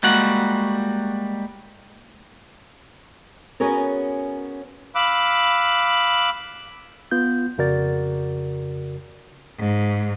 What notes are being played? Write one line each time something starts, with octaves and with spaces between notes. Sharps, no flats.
G3 G#3 A#3 F#4 F#5
B3 C#4 F#4 G#4 A#4 C#5
F5 B5 D6 E6 F#6
B3 F4 G6
F2 C#3 F#4 A#4 D5 A6
G#2